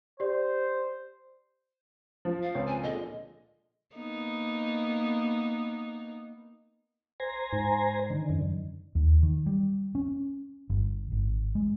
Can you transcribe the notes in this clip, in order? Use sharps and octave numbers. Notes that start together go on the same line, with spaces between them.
G4 C5 D5
F3
F5
C#2 C4 C#5
G#5
A#2 D3 G#3 D#5
A#3 B3 D#4
C5 G#5 A#5
G#2
D3 D#3
F#2
D#2
D#3
G3
C#4
G1
G#1
G#3